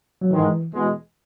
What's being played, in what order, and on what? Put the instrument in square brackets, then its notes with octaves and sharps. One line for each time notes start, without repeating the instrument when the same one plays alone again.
[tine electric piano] F#3
[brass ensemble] G#2 D#3 G#3 [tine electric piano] E3
[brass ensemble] E2 B2 G#3